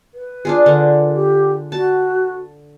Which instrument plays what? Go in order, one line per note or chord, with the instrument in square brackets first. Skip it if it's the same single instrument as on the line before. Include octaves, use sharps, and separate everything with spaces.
[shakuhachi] B4
[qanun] D4 F4 G#4
D3
[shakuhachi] G4
[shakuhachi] F#4 [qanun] A5